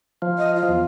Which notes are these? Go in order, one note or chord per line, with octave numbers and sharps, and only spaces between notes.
F3
D#5
F4
E2